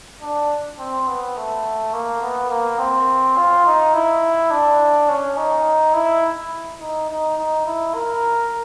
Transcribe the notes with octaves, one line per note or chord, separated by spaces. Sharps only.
D4
C4
B3
A3
A#3
B3
A#3
C4
F4
D#4
E4
D4
C#4
D#4
E4
D#4
D#4
D#4
E4
A#4